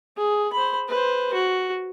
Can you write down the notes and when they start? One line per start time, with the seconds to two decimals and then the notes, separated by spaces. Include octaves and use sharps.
0.17 G#4
0.53 C5 B5
0.88 B4 C5
1.34 F#4